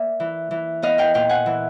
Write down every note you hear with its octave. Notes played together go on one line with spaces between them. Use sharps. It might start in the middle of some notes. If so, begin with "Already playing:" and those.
Already playing: A#3 D5 E5
E3
E3
B3 D#5 F5
F5 G5
A#2 F5 G5
F#5 G#5
E3